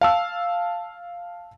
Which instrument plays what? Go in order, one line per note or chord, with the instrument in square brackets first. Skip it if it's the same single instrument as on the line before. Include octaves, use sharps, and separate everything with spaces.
[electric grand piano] F5 A5 E6